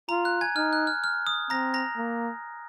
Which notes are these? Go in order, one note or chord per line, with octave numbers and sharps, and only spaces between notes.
F4 A#5
F#6
G#5 G#6
D#4 F6
F#6
F6
F6
D#6
C4 A#5 A#6
A#5 A#6
A#3